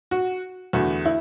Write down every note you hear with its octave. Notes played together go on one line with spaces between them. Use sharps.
F#4
E2 D3 A3 F#4
E4